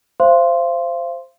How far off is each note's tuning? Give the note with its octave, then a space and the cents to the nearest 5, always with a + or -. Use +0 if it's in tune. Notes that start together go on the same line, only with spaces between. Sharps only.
C5 +0 F5 -35 C6 +0